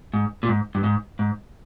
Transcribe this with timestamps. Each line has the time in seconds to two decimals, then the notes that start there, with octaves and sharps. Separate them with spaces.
0.14 G#2
0.43 A#2
0.49 G#2
0.75 G2
0.84 G#2
1.19 G#2